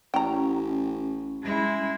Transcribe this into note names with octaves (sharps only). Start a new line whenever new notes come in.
A1 C#4 G5 A#5
G#3 E4